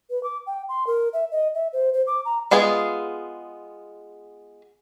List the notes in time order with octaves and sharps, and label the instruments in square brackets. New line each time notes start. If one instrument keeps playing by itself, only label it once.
[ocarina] B4
D6
G5
C6
A#4
E5
D#5
E5
C5
C5
D6
A#5
[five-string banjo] G#3 B3 F4 G#4